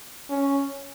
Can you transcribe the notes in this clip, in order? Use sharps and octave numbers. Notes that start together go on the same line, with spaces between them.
C#4